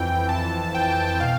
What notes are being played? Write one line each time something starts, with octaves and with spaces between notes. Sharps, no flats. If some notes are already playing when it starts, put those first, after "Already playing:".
Already playing: F2 E3 G5
F2 E3 A5
G5
B2 F5